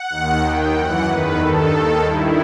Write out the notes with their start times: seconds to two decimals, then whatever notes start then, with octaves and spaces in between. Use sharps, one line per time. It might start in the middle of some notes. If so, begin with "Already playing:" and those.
Already playing: F#5
0.09 D#2 D#3
0.42 D#2 D#3 G5
0.74 F#2 E3 F#5
1.06 E2 D#3 B4
1.36 G2 D#3 A4
1.69 D#2 D#3 A4
2.01 G2 D#3 E4